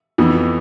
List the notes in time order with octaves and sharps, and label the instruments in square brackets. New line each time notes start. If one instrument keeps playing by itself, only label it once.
[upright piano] F2 E3 B3